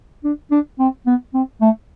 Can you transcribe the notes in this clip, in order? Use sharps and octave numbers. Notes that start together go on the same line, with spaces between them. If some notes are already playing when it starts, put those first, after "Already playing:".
D4
D4
C4
B3
C4
A3